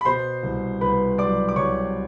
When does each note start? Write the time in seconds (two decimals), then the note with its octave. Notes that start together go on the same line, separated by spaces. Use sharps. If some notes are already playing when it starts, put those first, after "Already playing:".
0.01 B5
0.05 B2 C5 C6
0.43 C2
0.81 C2 B4 B5
1.18 F#3 D5 D6
1.49 D6
1.56 C2 C#5 C#6